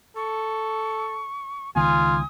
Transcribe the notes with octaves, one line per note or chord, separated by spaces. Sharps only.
A4 C#6
C#2 D#3 B3 F4 G#5 D#6